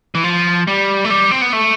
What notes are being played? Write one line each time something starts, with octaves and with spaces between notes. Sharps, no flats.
E3
F3
G3
A3
G3
C4
B3
A3